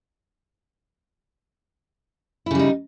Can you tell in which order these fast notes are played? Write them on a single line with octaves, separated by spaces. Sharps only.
E4 C#3 G3 D#4